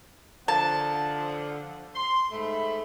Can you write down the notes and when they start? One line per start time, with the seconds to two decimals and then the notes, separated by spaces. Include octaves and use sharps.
0.48 D3 F3 F#5 A5
1.95 C6
2.32 G#2 A3 B5